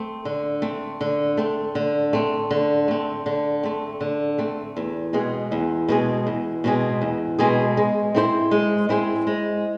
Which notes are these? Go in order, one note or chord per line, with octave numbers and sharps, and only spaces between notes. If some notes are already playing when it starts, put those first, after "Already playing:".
Already playing: A3 C4
D3
A3 C4
D3
A3 C4
D3
A3 C4
D3
A3 C4
D3
A3 C4
D3
A3 C4
E2
B2 G#3 C4 G#4
E2
B2 G#3 C4 G#4
E2
B2 G#3 C4 G#4
E2
B2 G#3 C4 G#4
G#3
C4 E4 G#4 C5
G#3
C4 E4 G#4 C5
G#3